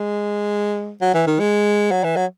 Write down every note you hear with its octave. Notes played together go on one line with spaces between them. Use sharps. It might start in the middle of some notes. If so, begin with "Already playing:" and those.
Already playing: G#3
F#3
E3
D#3
G#3
F#3
E3
F#3